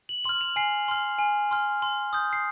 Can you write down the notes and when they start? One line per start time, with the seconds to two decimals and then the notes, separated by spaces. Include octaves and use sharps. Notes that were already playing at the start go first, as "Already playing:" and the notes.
0.09 F#7
0.24 C6 F6 F#7
0.41 F7
0.56 G#5 C7
0.88 C6 F6
1.19 G#5
1.51 C6 F6
1.82 C6
2.13 D#6 G6
2.33 C7